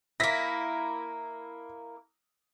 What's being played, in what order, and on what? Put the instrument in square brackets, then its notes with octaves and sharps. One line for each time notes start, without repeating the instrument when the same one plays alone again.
[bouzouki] A#3 E4 [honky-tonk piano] A#6 B6